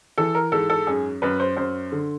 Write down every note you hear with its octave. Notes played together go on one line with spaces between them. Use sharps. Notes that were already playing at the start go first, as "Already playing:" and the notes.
E3 A4
A#4
G#2 A4
A4
F#2 G#4
F#2 B4
C5
F#2 C5
D3